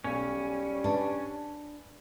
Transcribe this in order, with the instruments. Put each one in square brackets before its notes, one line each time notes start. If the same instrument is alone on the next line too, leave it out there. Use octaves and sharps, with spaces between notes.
[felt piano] B1 [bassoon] G3 [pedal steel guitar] C#4
[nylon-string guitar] D4 [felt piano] B4 G#5 A5